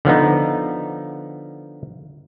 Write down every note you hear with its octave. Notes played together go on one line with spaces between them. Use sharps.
D3 F3 B3 D#4